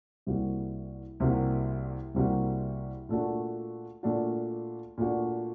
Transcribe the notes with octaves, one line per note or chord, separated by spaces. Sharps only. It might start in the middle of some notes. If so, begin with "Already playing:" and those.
C2 C3 G3 A#3 F#4
C2 C3 G3 A#3 F#4
C2 C3 G3 A#3 F#4
A#2 A3 D4 F#4
A#2 A3 D4 F#4
A#2 A3 D4 F#4